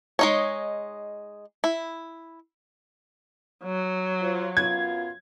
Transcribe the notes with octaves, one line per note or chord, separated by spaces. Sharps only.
G#3 D#4 C#5
E4
F#3
F4 C5
F#2 B3 F4 G#6